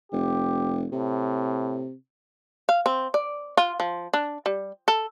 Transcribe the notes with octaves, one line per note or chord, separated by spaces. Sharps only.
F1 G4
A2 C3
F5
C4
D5
F4
F3
D4
G3
A4